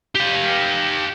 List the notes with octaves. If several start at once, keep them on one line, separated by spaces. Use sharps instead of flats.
G4 F5